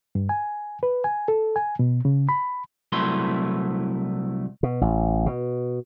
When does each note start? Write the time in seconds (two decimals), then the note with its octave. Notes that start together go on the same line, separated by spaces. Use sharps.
0.15 G2
0.29 G#5
0.83 B4
1.04 G#5
1.28 A4
1.56 G#5
1.79 B2
2.05 C#3
2.29 B5
2.92 C2 F#3 A3 E4 B4 C6
4.63 B2
4.81 A1
5.26 B2